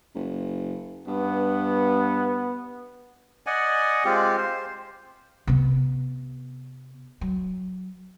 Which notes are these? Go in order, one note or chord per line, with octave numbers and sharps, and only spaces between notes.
F#1
G2 B3
D5 D#5 F#5 G#5
G#3 C4 F4 G4
C5
C3 B3
F#3